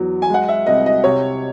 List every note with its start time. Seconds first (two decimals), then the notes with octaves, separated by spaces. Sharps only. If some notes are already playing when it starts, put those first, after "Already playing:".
Already playing: E2 F#3
0.22 G#5
0.30 G#3 F#5
0.49 E5
0.66 C2 D#5
0.86 D#5
1.04 C3 C#5